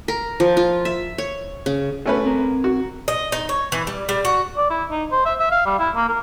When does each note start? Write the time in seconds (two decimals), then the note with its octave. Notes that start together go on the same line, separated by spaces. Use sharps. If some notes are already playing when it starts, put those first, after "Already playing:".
0.08 A#4
0.40 F3
0.57 F4
0.85 E5
1.18 C#5
1.66 C#3
2.06 A3 C#4 F#4 B4
2.24 C4 A#4
2.64 F#4
3.08 D#5
3.32 D#4
3.49 C#5
3.72 E3
3.87 G3
4.09 G3
4.25 F#4
4.57 D5
4.70 E4
4.91 D#4
5.12 C5
5.25 E5
5.40 E5
5.51 F5
5.66 G3
5.79 E4
5.95 A#3
6.09 A#4